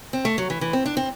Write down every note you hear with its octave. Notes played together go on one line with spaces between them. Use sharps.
C4
A3
F#3
E3
E3
C4
D4
C4